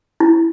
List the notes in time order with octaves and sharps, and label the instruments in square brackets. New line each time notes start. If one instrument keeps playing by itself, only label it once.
[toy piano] E4